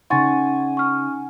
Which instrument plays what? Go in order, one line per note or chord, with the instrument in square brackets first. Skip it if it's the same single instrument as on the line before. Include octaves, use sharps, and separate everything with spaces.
[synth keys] C#3 C#4 D#4 [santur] F#5 G#5 [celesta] C6 C#6 A6
[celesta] C#6 F6